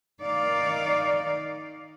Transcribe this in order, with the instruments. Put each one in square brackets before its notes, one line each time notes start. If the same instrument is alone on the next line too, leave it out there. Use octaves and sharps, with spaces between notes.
[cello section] D#3 D#4 D5 F5